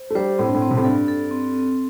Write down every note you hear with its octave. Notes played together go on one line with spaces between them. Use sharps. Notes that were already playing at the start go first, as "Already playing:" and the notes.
Already playing: C5
A3
G3 C5
A2 C4
G2
A2
C4
C3
A2
G2 A4
A4
C4
C4